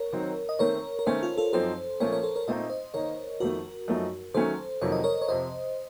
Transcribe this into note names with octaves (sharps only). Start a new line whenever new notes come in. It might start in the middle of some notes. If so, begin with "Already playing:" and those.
Already playing: A#4 C#5
D#3 F#3 C4 D#4
D#5
D#3 A3 C4 A#4 C#5
A#4
D#3 A3 C#4 A4 C5
F4
F4 A4
F#2 F3 C4 D#4 A4 C5
A#2 F3 A3 C#4 A#4 C#5
A#4 C#5
A4 C5
A#4 C#5
A#2 A3 C4 D#4 D#5
C5 D#5
D#3 A#3 D#4 A#4 C#5
F2 D#3 A3 F#4 A#4
F#2 F3 A3 D#4
D#3 F#3 A3 C#4 A4 C5
F2 C3 D#3 F#3 A#3 C#5
D#5
A#4 C#5
C#5
F2 C3 F3 C5 D#5